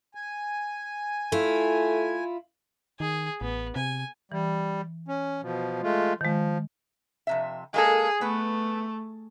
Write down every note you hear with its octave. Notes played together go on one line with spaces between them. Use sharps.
G#5
A3 E4 F4
D#3 G#4
A1 B3
C3 G#5
E3 G3
C#4
B2 F3
G#3 A3 F4
D#3 F3 G#3
F2 C3 E5
G#3 A#3 G#4 A4
A3 B3 B4